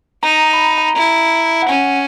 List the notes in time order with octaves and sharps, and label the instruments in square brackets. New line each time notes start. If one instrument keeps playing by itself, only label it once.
[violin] D#4 [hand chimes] A#5
[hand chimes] B5
A#5
A#5
[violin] E4 [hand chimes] A#5
[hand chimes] F#5
[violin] C#4 [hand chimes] G#5